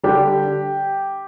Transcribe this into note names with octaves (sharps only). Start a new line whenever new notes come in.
D3 G3 D4 G4